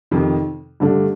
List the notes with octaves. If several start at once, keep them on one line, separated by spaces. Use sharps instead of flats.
F2 C3 D#3
G2 D3 A3 D4